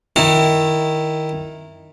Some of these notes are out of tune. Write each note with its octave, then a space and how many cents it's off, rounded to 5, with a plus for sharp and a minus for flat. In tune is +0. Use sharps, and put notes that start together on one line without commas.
D#3 +0 E4 +0 A5 +40